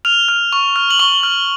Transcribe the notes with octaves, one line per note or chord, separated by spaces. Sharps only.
F6 F7
F6
C#6
F6
F#7
C#6 G7
F6